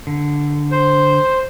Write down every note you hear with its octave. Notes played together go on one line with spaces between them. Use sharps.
D3
C5